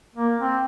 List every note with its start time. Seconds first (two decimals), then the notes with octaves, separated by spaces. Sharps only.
0.16 A#3
0.40 C4